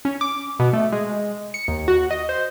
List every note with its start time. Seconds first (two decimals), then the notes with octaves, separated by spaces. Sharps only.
0.05 C#4
0.21 D6
0.59 B2
0.73 A3
0.92 G#3
1.54 C#7
1.68 D#2
1.88 F#4
2.11 D#5
2.29 C5